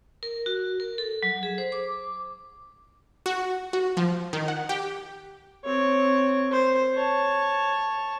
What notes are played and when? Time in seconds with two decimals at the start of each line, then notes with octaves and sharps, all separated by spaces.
0.23 A#4
0.46 F#4
0.80 A#4
0.98 A4
1.23 F#3
1.43 G#4
1.58 C5
1.72 D6
3.26 F#4
3.73 F#4
3.97 F3
4.33 D#3
4.48 F#5
4.69 G4
5.65 C4 C#5
6.52 C5
6.94 C#5 A5